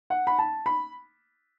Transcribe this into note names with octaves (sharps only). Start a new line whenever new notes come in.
F#5
B5
A5
B5